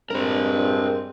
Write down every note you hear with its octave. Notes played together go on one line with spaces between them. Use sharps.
G2 G#3 C4 A#4 C5